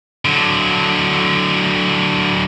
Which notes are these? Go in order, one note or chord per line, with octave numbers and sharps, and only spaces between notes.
D3 F#3